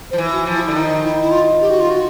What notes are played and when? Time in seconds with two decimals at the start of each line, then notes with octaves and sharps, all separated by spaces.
0.11 F3 C5
0.18 E3
0.32 F#4
0.46 F3
0.53 E4
0.68 D3 E4
0.75 D#3 D#4
1.03 E4
1.21 E4
1.31 F4
1.61 G4
1.70 F#4
1.80 F4
1.90 F#4